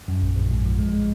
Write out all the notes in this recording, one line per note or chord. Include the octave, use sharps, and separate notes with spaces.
F#2
A#1
A#1
G#2
F3
G#3
G#3